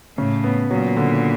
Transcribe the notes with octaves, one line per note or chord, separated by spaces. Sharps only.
A2 C#3
B3
A#2 F#3
D3